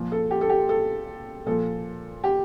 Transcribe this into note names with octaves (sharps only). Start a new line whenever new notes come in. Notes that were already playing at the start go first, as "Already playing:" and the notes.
Already playing: A#2 F3
A4
G4
A4
G4
A4
A#2 F3 A4
G4